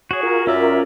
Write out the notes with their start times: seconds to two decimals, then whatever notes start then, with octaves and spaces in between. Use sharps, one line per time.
0.11 F#4 G#4 C#5
0.23 F4 A#4
0.47 F#2 C#4 D5 E5